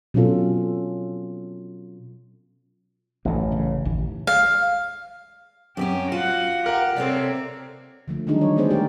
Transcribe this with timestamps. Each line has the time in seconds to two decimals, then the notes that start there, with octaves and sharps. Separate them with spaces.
0.14 B2 F#3 C4 C#4 F4 A4
3.25 A1 F#2 A2 E3
3.52 C#3
3.85 A1 D#2 E3
4.27 F5
5.77 F#2 C4 C#4 G4
6.12 F4 F#4 F#5
6.66 G4 A#4 F#5
6.96 C3 C4 A4 C#5 D5
8.08 D3 F3 A3
8.27 D#3 F#3 G3 D4 D#4 G#4
8.41 C#5
8.56 G#3 A3 B3 G#4 C5 D5
8.71 G4 A#4